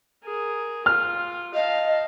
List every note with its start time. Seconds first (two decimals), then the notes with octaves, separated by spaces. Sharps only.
0.24 G#4 A#4
0.86 F4 F6
1.54 D#5 F5 A5